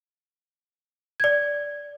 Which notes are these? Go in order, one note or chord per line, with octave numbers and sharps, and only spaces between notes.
D5 G#6